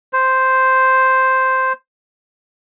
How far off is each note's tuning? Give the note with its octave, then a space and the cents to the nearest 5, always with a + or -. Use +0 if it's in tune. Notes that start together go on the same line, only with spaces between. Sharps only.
C5 +0